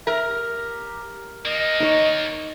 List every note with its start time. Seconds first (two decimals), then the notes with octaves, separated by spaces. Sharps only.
0.07 A#4 E5
0.27 G4
1.46 D#3 A#3 D#5
1.80 D#4 C#5